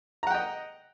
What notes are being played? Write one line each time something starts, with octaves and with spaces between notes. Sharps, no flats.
D#5 F#5 G5 A#5